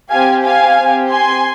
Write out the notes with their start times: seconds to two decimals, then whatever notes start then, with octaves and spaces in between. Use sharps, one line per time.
0.10 C4 G4 F5 G#5
0.44 F5 G#5
0.78 C4 G4
1.11 G#5 C6